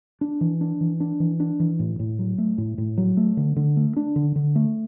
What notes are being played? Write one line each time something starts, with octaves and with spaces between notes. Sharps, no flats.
D4
E3
D4
E3
D4
E3
D4
E3
A2
A2
F#3
A3
A2
A2
F#3
A3
D3
D3
A3
D4
D3
D3
A3